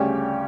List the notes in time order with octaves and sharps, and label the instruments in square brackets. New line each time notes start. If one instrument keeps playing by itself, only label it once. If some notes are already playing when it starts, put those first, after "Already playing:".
Already playing: [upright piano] D2 C#3 G3 C#4 G4